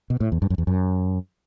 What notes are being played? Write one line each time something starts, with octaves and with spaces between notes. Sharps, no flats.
B2
A2
E2
G2
F#2
E2
F#2